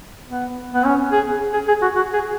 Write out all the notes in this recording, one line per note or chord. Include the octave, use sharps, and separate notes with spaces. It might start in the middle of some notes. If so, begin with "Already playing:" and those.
B3
B3
C#4
G#4
G#4
G#4
F#4
F#4
G#4